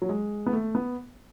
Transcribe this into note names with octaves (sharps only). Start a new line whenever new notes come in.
F#3
G#3
B3
A3
B3